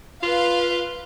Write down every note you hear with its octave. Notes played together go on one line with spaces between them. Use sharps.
F4 B4 F5